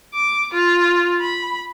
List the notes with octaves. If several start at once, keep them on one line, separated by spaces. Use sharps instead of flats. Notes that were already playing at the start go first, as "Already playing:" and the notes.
D6
F4
B5